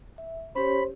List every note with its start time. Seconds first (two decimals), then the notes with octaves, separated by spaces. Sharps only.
0.18 E5
0.56 C#4 G4 C5 C#5 B5